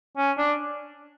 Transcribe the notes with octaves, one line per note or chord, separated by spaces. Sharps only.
C#4
D4